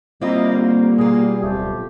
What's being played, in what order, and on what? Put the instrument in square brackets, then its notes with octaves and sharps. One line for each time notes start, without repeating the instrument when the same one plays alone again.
[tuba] G3 [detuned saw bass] A#3 [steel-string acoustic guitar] C4 F4 [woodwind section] E4 D#5
[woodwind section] D#2 D3
[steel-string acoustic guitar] B2 F4 [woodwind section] G#4
[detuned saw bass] D1 [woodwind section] F2 A3 G4